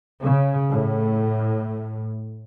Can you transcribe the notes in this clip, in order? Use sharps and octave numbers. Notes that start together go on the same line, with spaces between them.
C#3
A2